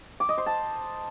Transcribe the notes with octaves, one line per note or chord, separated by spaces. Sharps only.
D6
D#5
C5
A5